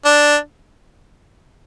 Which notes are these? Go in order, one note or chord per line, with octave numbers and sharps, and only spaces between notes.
D4